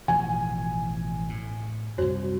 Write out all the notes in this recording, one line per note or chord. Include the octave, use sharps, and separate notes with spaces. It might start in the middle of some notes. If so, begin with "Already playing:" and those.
A1 B2 F3 G#5
A2
C2 F#2 F#4 C5